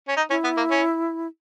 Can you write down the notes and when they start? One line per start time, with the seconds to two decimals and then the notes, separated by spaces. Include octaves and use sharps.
0.08 C#4
0.17 D#4
0.30 C#4 E4
0.44 B3
0.57 A#3
0.71 C#4